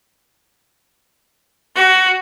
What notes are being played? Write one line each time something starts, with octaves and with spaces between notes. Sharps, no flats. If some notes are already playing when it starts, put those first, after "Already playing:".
F#4